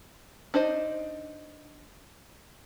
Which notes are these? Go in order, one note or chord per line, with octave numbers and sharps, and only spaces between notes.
D4 D#4 C5 D#5